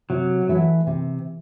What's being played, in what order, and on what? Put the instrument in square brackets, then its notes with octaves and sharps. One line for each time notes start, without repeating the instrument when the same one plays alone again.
[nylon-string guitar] C3 [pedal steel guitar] F#3
[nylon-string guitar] E3 A3 E4
C3